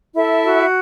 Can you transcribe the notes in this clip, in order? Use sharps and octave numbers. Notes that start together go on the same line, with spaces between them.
E4 A4 E5
F#4